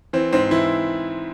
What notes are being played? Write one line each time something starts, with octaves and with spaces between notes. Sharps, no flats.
E3 C4
G#2 C4
E3 E4